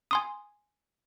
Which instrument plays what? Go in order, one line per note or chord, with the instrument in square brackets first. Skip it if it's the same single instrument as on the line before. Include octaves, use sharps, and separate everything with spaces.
[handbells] G#5 C6 D#6